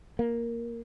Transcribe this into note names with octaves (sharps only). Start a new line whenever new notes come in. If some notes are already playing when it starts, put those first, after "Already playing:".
A#3